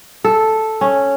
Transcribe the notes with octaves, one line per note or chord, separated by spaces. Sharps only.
A4
C#4